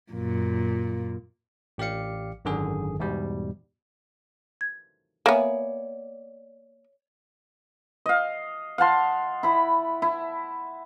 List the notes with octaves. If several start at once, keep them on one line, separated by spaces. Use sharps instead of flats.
F#2 A#2
A1 G4 D5 F5 C#7
G#1 F#2 D3 D#3 G#4
E2 G#2 B2 G3
G#6
A#3 B3 C#5 D5 E5 G#5
D#5 F5
F5 F#5 A5 C6
E4 B5
E4